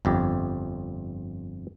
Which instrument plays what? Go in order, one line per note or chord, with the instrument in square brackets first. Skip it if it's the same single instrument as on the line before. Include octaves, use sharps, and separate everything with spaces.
[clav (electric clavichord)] G1 F2 G4